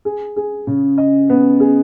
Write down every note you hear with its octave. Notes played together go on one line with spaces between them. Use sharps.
G#4
G#4
C#3
D#5
B3
G#4